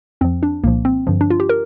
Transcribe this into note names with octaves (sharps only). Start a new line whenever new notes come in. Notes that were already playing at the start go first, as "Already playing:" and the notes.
F2 F3 C4
D4
C2 A#2 F3 A#3
C4
G2 D3 F3
D4
F4
G4
A#4